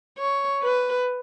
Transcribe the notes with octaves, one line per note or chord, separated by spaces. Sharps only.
C#5
B4